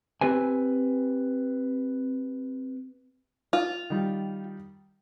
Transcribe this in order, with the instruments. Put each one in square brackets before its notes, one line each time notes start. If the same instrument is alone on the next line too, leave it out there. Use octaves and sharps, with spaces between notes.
[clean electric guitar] C4 G4 B4 G#5
[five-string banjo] F4
[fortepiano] D#3 G3